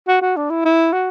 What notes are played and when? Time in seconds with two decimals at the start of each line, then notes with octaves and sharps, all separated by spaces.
0.08 F#4
0.22 F#4
0.36 D4
0.50 E4
0.65 E4
0.93 F#4